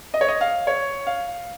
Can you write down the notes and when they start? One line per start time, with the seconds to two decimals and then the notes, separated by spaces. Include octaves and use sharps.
0.14 D#5
0.21 C#5
0.28 D#5
0.41 F5
0.67 C#5
1.07 F5